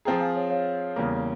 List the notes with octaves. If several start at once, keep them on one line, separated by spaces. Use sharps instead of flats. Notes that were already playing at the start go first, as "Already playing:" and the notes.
F3 C4 F4 G#4 G5 A#5
F5 G#5
C#5 F5
C#5 F5
E2 C#3 G3 A#3